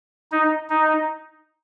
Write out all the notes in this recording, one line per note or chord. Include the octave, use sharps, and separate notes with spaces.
D#4
D#4